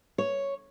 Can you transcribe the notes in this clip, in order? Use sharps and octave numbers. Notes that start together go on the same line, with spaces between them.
C#5